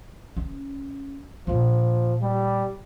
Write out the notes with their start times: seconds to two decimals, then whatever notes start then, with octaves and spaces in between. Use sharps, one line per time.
0.37 C#4
1.47 A#2 F3 A#3
2.21 G3